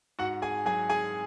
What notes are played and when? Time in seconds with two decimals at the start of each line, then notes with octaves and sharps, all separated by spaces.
0.19 G#2 F#4 F#5
0.42 G#4 G#5
0.65 F#3 G#4 G#5
0.90 G#4 G#5